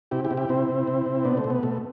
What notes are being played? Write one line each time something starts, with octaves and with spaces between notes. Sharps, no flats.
C3 E4 G4
E4 G4
C3
E4 G4
C3 C4 E4
C3
C3
C3
B2 B3 D4
A3 C4
B2
B3
B2 A3